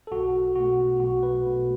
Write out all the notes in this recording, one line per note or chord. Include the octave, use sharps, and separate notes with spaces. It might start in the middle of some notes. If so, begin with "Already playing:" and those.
A4
B1 F#4
B2 A3 F#4
B1 F#4
B4
B2 A3